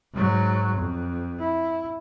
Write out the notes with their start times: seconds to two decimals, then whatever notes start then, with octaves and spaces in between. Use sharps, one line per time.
0.13 G#2 F#3
0.77 F2
1.40 E4